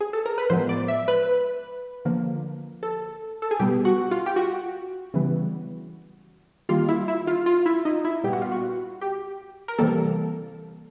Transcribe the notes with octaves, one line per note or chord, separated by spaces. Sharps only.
G#4
A4
A#4
B4
A2 F3 G#3 B3 C5
D5
E5
B4
D3 F3 A#3
A4
A4
G#4
B2 G3 B3 G4
F#4
F4
G4
F#4
C#3 E3 G3 B3
D#3 G3 A#3 F4
E4
E4
F4
F4
E4
D#4
E4
A#2 G3 B3 G4
F#4
F4
F#4
G4
A#4
C3 E3 G3 A#3 A4